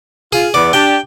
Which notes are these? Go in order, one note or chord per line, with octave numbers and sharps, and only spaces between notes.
F4 G#4
E2 B3 D5
D4 G4 G5